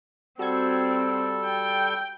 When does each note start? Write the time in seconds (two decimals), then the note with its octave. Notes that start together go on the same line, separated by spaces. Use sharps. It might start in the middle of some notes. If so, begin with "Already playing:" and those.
0.39 G3 C4 F#4 A4 G#6
1.45 G5